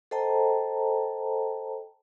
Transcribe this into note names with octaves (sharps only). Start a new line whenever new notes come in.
A4 C5 D#5 G5 A5 A#5